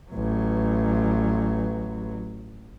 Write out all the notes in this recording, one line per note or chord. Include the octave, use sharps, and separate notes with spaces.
A1 F#3